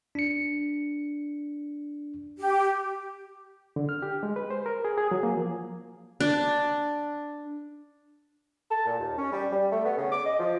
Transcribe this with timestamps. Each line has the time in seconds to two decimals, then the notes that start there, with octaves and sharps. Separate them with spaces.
0.15 D4 C#7
2.38 G4
3.76 D3
3.89 F6
4.02 G4
4.23 G#3
4.36 B4
4.50 C5
4.66 A#4
4.85 G#4
4.97 G#4
5.11 F#3
5.23 A#3
5.37 F3
6.20 D4
8.71 A5
8.86 A#2
8.99 D#2
9.18 C#4
9.33 G3
9.52 G3
9.72 A3
9.84 B3
9.97 C#3
10.12 D6
10.26 D#5
10.39 F3